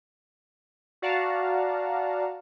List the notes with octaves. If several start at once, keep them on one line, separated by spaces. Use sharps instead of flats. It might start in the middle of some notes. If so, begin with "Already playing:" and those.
F#4 D5 F5 F#5 A5 A#5